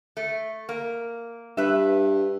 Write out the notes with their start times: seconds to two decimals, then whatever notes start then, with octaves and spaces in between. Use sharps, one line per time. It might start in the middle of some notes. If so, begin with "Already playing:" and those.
0.17 A3
0.69 A#3
1.57 G2 B4 E5